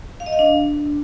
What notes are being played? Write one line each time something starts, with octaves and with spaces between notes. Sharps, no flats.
F5
D#5
F5
D4